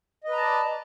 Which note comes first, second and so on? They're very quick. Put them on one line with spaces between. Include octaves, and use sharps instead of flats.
D#5 B4 A#5 A5 D5